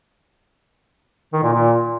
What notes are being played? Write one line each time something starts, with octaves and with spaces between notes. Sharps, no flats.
D#3
A#2
A#2